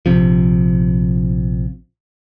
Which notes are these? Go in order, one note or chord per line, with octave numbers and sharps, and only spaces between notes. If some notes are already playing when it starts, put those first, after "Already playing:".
A#1 C3 F3